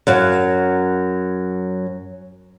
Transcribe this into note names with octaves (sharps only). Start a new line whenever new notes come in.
F#2 F#3 F5